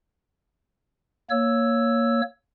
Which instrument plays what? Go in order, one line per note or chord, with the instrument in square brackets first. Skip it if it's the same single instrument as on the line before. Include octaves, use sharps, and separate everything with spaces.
[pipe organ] A#3 C#5 E6